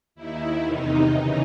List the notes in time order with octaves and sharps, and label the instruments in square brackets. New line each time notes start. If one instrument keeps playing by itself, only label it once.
[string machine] D#2 D#3 E4
E2 C3 D#3 D#4
C#3 E3 D#4